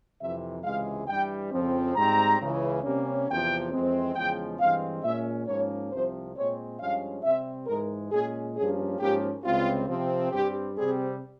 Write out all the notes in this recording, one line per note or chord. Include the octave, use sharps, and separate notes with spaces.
F2 C3 E3 E5
C#2 C3 E3 G#3 F5
G2 E3 G3 G5
F2 C#3 F3 C4
G#2 G3 C4 A#5
C#2 C#3 E3
C3 G3 A#3 C#4
E2 C3 F3 G5
F2 E3 G#3 C4
E2 C#3 F3 G#3 G5
G2 E3 G#3 C4 F5
A#2 G#3 C#4 E5
G#2 F3 A#3 C#4 C#5
C2 C3 F3 C4 C5
A#2 G#3 C4 C#5
G2 F3 G#3 C#4 F5
C3 G3 C4 E5
G#2 E3 G#3 A#4
A#2 G#3 C#4 G#4
G2 F3 A#3 C#4 G#4
G#2 F3 A#3 C#4 G4
C#2 C3 G3 C4 F4
C3 F3 C4
G2 G3 C4 G4
C3 G3 C4 G#4